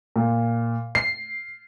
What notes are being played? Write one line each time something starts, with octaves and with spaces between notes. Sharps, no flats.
A#2
C7